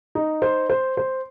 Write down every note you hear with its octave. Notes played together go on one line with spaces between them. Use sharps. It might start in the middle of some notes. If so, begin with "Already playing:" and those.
D#4
C5
C5
C5